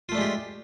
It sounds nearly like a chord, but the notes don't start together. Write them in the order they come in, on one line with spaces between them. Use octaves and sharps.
F4 A3 D4 G#3 G4